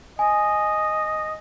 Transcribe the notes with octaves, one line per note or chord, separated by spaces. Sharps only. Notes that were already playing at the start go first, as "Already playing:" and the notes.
D#5 G#5